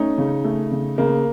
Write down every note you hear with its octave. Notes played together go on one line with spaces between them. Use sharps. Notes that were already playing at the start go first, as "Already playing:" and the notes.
Already playing: A3 C#4 D#4
C#3
A3
C#3
C#3 A#3